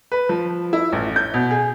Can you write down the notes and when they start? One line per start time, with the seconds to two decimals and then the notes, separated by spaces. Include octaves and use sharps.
0.12 B4
0.29 F3
0.73 E4
0.93 A1
1.16 G6
1.34 B2
1.51 G#4